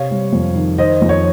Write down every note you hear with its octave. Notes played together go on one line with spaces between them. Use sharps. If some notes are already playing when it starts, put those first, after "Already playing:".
Already playing: C3 C#5 F5
G3
F2
D#3
D#3 C5 D#5
F2
C#5